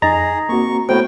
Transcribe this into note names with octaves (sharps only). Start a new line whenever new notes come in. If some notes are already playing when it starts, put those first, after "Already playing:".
F2 D#4 G#4 D#5 A#5
A#3 C4 F#4 C#6
A2 A3 B3 F#4 C5 G5